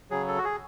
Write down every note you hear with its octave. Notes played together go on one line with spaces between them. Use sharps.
C#3 F#3 G#4
A4
F#4
G#4